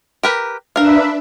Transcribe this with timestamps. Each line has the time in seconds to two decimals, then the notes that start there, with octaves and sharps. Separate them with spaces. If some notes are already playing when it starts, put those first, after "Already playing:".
0.23 G4 A#4 B4
0.76 D4 A#4 B4 E5 F5